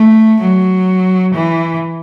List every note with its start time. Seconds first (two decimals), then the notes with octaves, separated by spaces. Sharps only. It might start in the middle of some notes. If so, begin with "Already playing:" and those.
Already playing: A3
0.41 F#3
1.34 E3